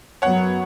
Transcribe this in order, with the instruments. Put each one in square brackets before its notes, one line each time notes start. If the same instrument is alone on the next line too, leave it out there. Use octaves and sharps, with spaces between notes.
[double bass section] F#2 F#3 B3 [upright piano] C#5 F#5